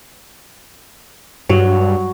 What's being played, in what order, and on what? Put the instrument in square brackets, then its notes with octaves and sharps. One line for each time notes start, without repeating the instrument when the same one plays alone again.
[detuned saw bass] G2 [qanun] F#3